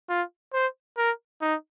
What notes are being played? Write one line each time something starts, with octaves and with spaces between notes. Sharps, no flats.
F4
C5
A#4
D#4